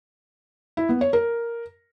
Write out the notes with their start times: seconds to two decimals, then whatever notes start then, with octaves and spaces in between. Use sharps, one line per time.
0.77 E4
0.89 B3
1.01 C#5
1.13 A#4